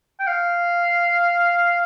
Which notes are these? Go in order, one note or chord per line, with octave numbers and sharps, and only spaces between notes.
G5
F5